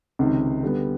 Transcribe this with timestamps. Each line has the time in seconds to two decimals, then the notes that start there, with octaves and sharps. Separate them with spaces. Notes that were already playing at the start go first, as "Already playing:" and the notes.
0.19 C#2 C3 D#3
0.63 D3 G3 B3